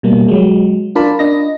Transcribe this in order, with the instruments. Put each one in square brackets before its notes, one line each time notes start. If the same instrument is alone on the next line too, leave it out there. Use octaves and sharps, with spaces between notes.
[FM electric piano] B2 G3 A#3
F#3 G#3
D4 F4 A#4 D5 A5 B5
D4 D#5 A#6